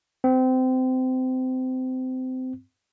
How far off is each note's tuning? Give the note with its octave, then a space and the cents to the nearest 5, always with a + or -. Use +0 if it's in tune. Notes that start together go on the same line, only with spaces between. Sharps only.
C4 -25